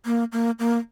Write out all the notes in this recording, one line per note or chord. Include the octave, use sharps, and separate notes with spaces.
A#3
A#3
A#3